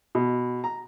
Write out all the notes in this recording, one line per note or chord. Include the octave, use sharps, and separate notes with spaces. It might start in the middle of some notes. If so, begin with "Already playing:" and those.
B2
A#5